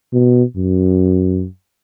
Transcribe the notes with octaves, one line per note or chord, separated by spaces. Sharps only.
B2
F#2